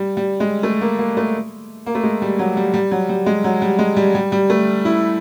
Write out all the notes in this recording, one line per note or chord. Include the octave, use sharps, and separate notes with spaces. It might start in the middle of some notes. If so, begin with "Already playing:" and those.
Already playing: G3
G3
G#3
A3
A#3
A#3
A3
A#3
A3
G#3
G3
F#3
G3
G3
F#3
G3
G#3
F#3
G3
G#3
G3
G3
G3
A3
E4